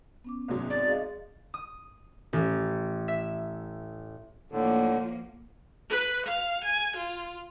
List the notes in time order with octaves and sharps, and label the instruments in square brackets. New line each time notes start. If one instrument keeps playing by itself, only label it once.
[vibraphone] B3 C#4 D6
[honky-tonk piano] C2 G#2 F#3
[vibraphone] C4 [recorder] D5
[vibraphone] G#4 D#5 F5
[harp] D#6
A1
E5
[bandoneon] A2 D3 [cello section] F3 A#3
[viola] B4
F5
G#5
F4